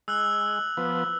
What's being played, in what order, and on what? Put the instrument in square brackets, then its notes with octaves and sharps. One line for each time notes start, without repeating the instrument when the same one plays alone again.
[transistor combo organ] G#3 [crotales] E6 F#6 F#7
[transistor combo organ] F3 B3